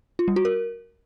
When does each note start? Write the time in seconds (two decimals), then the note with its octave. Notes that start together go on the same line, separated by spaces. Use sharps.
0.19 F4
0.28 G3
0.36 F#4
0.45 A#4